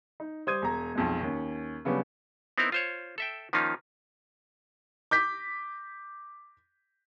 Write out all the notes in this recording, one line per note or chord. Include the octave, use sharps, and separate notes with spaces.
D#4
G3 C5 D#6 G#6 D#7
E1 A#5
B1 F2 G#3
D#2 C#4
C#3 F#3 G3 B3 C#4 D4
B3 C4 D#4 E4 A#4
F4 C5 C#5
A4 E5 G5
D#3 F3 A#3 C#4 D#4 F4
D6 G6 B6